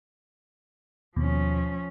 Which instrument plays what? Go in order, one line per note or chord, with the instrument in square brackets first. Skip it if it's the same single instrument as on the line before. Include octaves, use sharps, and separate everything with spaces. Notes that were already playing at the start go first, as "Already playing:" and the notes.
[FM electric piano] D#2 B2 [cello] F3 C#4